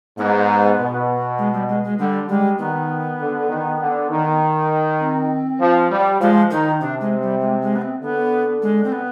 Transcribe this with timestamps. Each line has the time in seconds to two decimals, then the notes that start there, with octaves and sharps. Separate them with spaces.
0.18 G#2 B3
0.79 B2
1.38 G#3
1.53 G3
1.69 G#3
1.84 G#3
1.99 D3 G3
2.29 G3 G#3
2.59 D#3 B3
3.20 D3
3.49 D#3
3.80 D3
4.10 D#3
5.00 C4
5.60 F3
5.91 G3
6.20 F3 G#3
6.51 D#3 D#4
6.81 C3 D4
7.01 G#3
7.21 G3
7.41 G#3
7.62 G#3
7.76 B3
7.81 C4
8.01 D3 B3
8.62 G#3
8.84 C4
8.92 B3